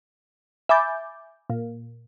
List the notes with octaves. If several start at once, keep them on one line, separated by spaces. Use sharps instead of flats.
E5 G#5 B5 D6 G6 A6
A#2